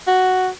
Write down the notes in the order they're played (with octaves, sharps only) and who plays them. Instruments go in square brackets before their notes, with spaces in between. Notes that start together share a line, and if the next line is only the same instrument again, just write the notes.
[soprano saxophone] F#4